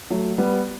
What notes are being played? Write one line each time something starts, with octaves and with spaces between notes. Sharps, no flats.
F#3 A3
G3 B3